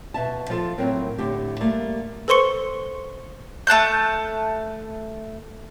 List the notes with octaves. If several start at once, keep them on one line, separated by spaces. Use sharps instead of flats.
B2 E5 A5
F3 F4 A4
A2 F#3 C4 A#4
A2 D3 G4
G3 A3 A#3
A4 B4 C5 C6 C#6 C#7
A3 A5 F#6 G6